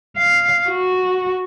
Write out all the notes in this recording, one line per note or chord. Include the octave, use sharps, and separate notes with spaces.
F5
F#4